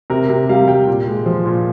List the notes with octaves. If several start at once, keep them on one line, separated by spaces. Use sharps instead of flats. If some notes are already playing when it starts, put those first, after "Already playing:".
C3 A#4
C3
G3 F5
G3 G5
A#2
G#3
F3
A#2